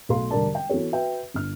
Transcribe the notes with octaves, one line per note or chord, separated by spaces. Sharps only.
B1 A3 A4 F5 C6
E1 D3 G3 A#4 D5 A5
G5
E3 B3 F#4 A4 C#5
F#4 B4 E5 G5
G1 F6